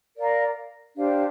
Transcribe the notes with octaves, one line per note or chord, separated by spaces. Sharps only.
A#4 D5 F5 A#5
D4 G4 C5 F5